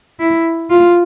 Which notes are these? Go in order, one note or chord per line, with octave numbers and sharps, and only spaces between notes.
E4
F4